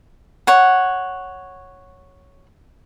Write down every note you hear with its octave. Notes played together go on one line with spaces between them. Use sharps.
C#5 F#5